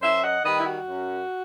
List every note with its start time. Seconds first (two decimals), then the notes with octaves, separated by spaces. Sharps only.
0.02 F#2 C5 E5
0.23 D#5 F#5
0.44 D#3 G3 B4 D#5
0.60 E4
0.65 F#4
0.87 F#2